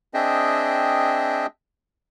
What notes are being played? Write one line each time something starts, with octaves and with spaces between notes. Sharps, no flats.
C4 D4 G#4 D#5 E5 G5